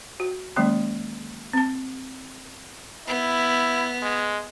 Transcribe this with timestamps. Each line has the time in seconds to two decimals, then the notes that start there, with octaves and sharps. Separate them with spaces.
0.20 F#4
0.56 D#3 F#3 G#3 A#3 C#4 C6
1.53 C4 A5
3.07 B3 E4
4.02 G#3